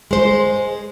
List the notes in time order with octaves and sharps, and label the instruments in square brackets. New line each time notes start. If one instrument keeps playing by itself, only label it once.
[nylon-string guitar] G#3 C5